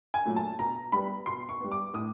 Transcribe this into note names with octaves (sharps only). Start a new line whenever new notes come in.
G#5
A#2 F#3 A3
A5
B2 A#5
G3 B3 B5
B2 C6
C#6
G3 B3
D6
A2 D#6